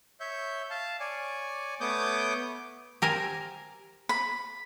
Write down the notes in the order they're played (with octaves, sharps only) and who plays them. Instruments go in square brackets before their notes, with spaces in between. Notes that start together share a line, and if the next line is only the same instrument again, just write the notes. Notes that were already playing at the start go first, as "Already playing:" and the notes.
[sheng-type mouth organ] C#5 E5 G6
F5 A5
C#5 D5 G#5
A3 B3 C#5 D6 D#6 G6
[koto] G4 A#4 C5 G#5
[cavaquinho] B5